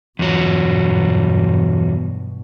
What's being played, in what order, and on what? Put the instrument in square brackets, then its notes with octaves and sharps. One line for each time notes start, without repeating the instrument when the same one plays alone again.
[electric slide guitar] E2 F#3 [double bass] G2 B2